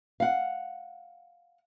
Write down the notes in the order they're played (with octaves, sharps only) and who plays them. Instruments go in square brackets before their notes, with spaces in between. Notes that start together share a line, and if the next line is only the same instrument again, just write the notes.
[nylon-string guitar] F5 F#5